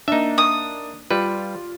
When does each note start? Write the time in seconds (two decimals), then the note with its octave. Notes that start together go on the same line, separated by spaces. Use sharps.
0.08 A#3 D4 D#4 E5
0.38 D#6
1.11 G3 F4 B4